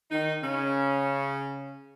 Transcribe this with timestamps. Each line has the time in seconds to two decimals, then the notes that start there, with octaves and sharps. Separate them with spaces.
0.11 D#3 D#4
0.43 C#3 C#4